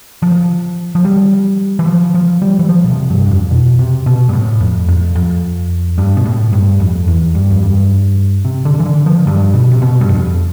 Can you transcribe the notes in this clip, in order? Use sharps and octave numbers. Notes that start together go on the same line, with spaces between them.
F3
F3
G3
E3
F3
F3
G3
E3
F3
B2
C3
G2
G2
F2
B2
C3
B2
G2
A2
F2
F2
F2
G2
B2
A2
G2
F2
E2
G2
F2
G2
C3
D3
E3
D3
F3
G2
B2
C3
B2
G2
F2